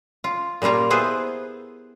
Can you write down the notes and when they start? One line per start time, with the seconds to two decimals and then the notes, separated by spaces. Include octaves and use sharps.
0.24 F4
0.62 A#2 G3 A#3 F4 A#5
0.90 B3 E4 G#4 B4 C5